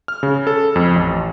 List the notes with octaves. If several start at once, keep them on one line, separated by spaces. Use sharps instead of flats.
F6
C#3
A4
F2
A1